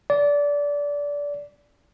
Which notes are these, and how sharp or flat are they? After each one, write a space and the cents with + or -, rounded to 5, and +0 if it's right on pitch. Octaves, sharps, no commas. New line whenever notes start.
D5 -20